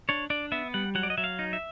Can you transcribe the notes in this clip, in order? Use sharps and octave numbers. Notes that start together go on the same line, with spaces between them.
D4 C#5
D4 D5
B3 E5
G3 F#5
F#3 F#5
D5
D#5
F#3 E5
F5
D#4
E5